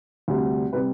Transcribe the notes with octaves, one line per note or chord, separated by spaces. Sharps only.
D2 C3 G3
C3 G3 B4